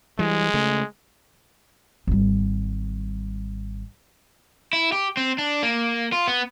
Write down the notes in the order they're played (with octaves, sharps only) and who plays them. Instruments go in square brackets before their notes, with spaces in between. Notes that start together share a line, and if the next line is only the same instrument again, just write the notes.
[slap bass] E3 G3 [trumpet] G#3
[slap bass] C#3 A3
[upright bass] G#1 G3
[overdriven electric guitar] E4
G4
C4
D4
A#3
F4
B3